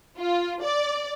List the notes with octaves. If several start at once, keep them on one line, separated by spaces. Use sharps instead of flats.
F4
D5